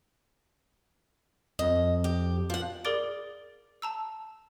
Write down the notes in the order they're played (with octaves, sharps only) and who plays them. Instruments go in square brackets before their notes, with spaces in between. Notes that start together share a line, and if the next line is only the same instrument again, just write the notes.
[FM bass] F2 [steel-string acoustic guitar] D#5
[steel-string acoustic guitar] G4
F3 F#5
[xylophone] G#4 A#4 D5 D6 A6 D7
A5 A#5 E6